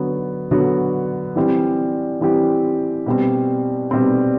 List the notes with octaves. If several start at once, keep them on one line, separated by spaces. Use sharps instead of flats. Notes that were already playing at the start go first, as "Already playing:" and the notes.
Already playing: D3 F#3 B3 F#4
D3 F#3 B3 F#4
E3 G3 C4 G4
E3 G3 C4 G4
B2 G3 C4
B2 G3 C4